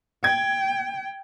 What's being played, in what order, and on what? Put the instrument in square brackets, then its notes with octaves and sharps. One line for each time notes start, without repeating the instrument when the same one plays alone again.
[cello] G5 [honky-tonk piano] G#6